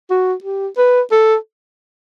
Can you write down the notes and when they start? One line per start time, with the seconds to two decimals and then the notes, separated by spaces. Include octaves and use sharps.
0.10 F#4
0.44 G4
0.78 B4
1.12 A4